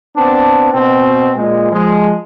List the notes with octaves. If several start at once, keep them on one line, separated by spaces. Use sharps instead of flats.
B3 C4 D4
B2 C4
A#2 G#3
F3 G#3